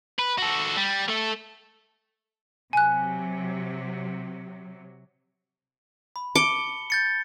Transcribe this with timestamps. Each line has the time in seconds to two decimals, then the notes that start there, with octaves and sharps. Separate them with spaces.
0.19 B4
0.38 F#4 A4
0.76 G3
1.08 A3 A4
2.73 C3 F#3 G#5 F#6
6.16 B5
6.36 A5 D6 C#7 G7
6.90 G6 A6 C#7